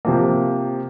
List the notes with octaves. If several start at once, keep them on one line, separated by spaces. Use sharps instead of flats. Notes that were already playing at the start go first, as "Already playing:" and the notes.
C3 F3 A#3